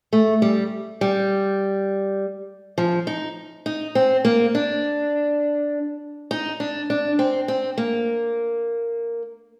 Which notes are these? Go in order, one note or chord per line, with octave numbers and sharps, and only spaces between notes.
A3
G3
G3
F3
D#4
D#4
C4
A#3
D4
D#4
D4
D4
C4
C4
A#3